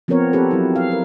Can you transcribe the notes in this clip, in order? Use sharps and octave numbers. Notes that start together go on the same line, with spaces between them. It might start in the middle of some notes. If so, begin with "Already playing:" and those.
F3 B3 C4 A#4 C#5
C4 G4 A4 B4
F#3 E4
F5
A#4